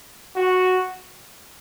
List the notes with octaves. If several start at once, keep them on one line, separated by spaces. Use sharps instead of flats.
F#4